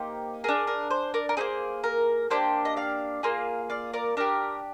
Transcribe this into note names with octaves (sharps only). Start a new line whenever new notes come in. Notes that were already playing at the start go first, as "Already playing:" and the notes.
Already playing: A#3 D#4 G4 C5
D4 G#4 A#4
A#4
C5
A#4 D5
A#4
A#3 D#4 G#4 C5
A#4
A#3 D4 G4 C5
D#5
D5 F5
A#3 F4 G#4
D5 F5
A#4 D5
D4 G4 A#4